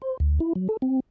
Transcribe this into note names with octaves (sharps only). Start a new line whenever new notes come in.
C5
D2
E4
F#3
A4
C4